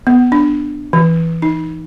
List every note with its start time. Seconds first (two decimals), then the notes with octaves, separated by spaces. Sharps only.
0.07 B3
0.32 D4
0.93 E3
1.42 D#4